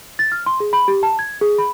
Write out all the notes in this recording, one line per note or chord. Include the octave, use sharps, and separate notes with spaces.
A6
F6
C6
G#4
B5
G4
A5
G#6
G#4
B5